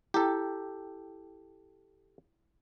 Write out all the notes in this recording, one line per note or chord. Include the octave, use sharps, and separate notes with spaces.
E4 G4 A4 G5